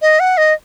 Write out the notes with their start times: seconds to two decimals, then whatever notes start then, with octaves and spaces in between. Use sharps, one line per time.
0.02 D#5
0.20 F#5
0.37 D#5